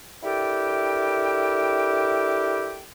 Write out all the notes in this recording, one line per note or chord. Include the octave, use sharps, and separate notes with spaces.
D4 E4 G4 A4 A#4 G5